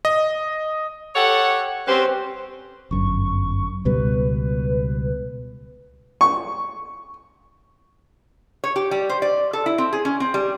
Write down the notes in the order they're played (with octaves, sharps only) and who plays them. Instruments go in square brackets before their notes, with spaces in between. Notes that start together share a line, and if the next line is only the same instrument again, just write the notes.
[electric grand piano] D#5
[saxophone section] G4 A4 C#5 F#5
G3 C4 C#4 G4 B4 C5
[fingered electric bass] G1 F#2 [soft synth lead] C#6
[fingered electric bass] C#2 B2 G3 [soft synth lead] B4
[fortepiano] C#6
[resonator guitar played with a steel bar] C#5
G4
G3
C5
D5
A4
E4
C4
G#4
C#4
C4
G3